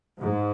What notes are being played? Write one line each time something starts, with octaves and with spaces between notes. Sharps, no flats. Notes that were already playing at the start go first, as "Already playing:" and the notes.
G#2